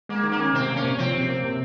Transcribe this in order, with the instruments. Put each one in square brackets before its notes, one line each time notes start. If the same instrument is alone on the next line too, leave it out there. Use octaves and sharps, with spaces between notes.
[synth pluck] G#3 [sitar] A#3
[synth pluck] D#3
[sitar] A#3
[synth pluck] C#4
[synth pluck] C3 [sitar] C4
[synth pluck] A#3
[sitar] C#4
[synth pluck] C3
[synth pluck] F3 [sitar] C4
[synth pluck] C3
A#3
C3